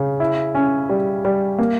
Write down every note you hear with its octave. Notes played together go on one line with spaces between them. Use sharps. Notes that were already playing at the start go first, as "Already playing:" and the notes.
Already playing: C#3
E4
C#4
G3
G3
A#3